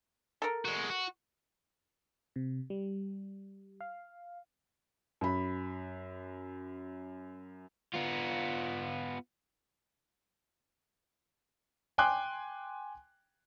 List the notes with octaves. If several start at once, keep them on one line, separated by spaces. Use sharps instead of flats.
A4 A#4
G#3 F#4
F#4
C3
G3
F5
F#2 B5
B3 F4
G5 G#5 C6 D6 F#6